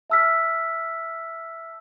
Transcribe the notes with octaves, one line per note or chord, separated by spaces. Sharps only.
E5 A5 E6 F6 B6